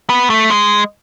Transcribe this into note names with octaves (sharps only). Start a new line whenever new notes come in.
B3
A3
G#3